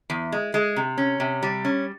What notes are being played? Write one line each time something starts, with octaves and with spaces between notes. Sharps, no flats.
E2
G#3
G#3
C3
C#4
C3
G3
C#4